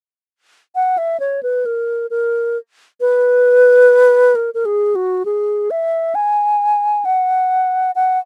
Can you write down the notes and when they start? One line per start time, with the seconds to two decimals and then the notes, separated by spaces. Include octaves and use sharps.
0.75 F#5
0.98 E5
1.20 C#5
1.43 B4
1.66 A#4
2.10 A#4
3.01 B4
4.35 A#4
4.54 A#4
4.65 G#4
4.95 F#4
5.25 G#4
5.71 E5
6.15 G#5
7.05 F#5
7.95 F#5